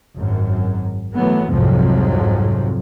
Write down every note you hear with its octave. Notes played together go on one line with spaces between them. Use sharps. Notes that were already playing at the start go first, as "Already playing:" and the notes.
G#1 F#2
E3 F#3 A3 B3
C2 F2 G#2 C3 F3 F#3